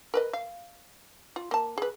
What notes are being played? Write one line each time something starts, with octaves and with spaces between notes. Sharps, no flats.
A#4 B4 D#5
F5
F4
A#3 A5
G#4 B4